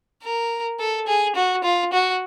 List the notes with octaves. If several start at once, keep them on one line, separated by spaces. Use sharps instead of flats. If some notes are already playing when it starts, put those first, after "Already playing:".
A#4
A4
G#4
F#4
F4
F#4